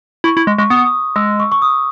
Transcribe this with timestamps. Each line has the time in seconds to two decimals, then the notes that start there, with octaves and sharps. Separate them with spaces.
0.24 E4 C#6
0.37 E4
0.47 G#3
0.58 G#3 C#6
0.70 B3 D#6
1.16 G#3 E6
1.40 C#6
1.52 C#6
1.62 D#6